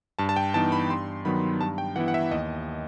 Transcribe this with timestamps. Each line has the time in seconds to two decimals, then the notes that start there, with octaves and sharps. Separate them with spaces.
0.19 G2 A5
0.29 A5
0.36 G5
0.54 E3 B3 D#4 A5
0.72 B5
0.90 G2 C6
1.25 D#3 F#3 B3 B5
1.60 G2 A5
1.78 G5
1.96 E3 B3 E4 F#5
2.08 F#5
2.14 E5
2.31 D#2 D#5